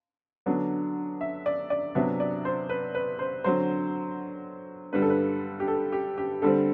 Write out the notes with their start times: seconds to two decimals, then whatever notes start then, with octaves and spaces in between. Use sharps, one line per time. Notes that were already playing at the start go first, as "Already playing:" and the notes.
0.46 D3 F#3 B3 D4
1.21 E5
1.46 D5
1.70 D5
1.95 C3 F#3 B3 D4 E5
2.20 D5
2.45 C5
2.69 B4
2.95 B4
3.19 C5
3.44 D3 F#3 C4 C5
4.93 G2 D3 G3 B4
5.02 A4
5.10 B4
5.60 G4
5.68 A4
5.92 G4
6.18 G4
6.42 D3 G3 C4 A4